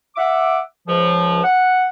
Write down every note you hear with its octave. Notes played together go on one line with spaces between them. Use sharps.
E5 F#5 D6
C#2 F3
F#5